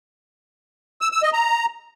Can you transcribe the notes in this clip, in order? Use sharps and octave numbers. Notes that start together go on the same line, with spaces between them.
E6
E6
D#5
A#5